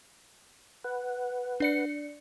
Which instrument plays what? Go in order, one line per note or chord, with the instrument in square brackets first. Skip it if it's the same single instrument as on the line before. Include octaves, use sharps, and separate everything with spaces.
[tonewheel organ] B4 F#5
[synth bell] D4 D5 C#7